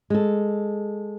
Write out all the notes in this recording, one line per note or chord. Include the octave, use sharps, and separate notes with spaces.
G#3 A4